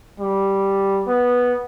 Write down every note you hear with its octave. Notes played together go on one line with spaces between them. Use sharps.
G3
B3